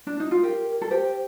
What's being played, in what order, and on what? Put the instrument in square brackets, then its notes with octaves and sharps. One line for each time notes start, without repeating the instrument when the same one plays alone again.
[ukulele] D4
D#4
F4
[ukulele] G4 [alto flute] A#4
[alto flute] A#4
[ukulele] A4
[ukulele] G4 [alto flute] C5